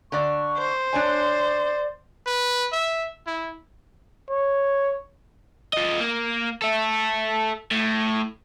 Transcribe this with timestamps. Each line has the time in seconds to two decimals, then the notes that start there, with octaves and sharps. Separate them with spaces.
0.12 D3 D4 D5 C#6
0.57 C5
0.93 D4 C#5 D5 G#5
2.26 B4
2.73 E5
3.27 E4
4.30 C#5
5.73 F4 D#5
6.00 A#3
6.62 A4 E5
7.72 A2